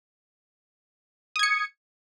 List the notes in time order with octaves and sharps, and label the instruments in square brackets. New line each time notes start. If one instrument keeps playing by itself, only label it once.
[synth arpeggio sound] D#6
G#6
C#7